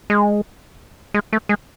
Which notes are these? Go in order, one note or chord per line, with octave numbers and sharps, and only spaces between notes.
G#3
G#3
A3
G#3